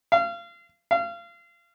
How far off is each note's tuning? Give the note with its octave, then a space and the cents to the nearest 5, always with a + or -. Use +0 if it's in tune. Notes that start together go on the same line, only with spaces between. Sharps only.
F5 -30
F5 -30